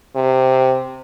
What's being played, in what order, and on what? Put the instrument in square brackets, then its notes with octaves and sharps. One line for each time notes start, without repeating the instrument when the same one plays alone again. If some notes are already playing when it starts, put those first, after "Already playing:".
[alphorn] C3